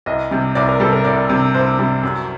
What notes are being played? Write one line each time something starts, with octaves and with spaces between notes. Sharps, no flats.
C2 D#5
C3 G3
C2 D5
A#4
C3 G3 A4
A#4
C2 D5
C3 G3
C2 C5
C3 G3
F#2